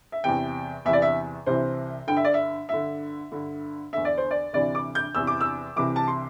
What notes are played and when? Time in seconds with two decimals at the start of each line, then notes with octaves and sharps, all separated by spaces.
0.12 E5
0.24 E2 C3 E3 G5
0.85 E2 C3 E3 E5
0.93 D5
1.02 E5
1.46 C2 C3 E3 C5
2.07 G2 D3 G5
2.17 E5
2.24 D5
2.34 E5
2.69 G2 D3 E5
3.31 G2 D3
3.93 E2 D3 E5
4.05 D5
4.18 C5
4.31 D5
4.53 D2 C3 E3 D5
4.75 D6
4.95 G6
5.15 E2 C3 E3 E6
5.27 D6
5.41 E6
5.76 C2 C3 E3 D6
5.96 A5
6.08 C6